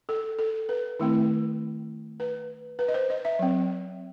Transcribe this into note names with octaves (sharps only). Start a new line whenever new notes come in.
A4
A4
B4
D#3 A3 C4 E4
B4
B4
D#5
C5
D#5
E5
F#3 C4